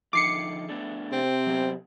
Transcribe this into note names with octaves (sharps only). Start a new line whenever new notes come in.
D3 F3 D#4 D6 C7 C#7
A3 B3 D4
C3 C4
F#3 B3 G4